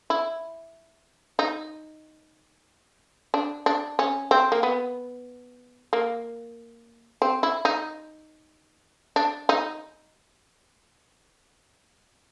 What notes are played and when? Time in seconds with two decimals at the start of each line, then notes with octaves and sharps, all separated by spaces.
0.10 E4
1.39 D#4
3.34 D4
3.66 D4
3.99 C#4
4.31 C4
4.52 A#3
4.63 B3
5.93 A#3
7.22 C4
7.43 E4
7.65 D#4
9.16 D4
9.49 D#4